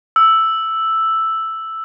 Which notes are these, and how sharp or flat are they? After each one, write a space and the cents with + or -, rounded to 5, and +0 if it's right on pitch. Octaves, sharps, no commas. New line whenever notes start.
E6 +0